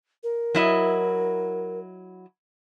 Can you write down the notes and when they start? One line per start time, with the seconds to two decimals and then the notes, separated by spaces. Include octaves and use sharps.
0.23 A#4
0.55 F#3 E4 D#5